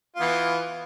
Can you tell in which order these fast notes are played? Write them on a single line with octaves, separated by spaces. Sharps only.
F4 B3 E3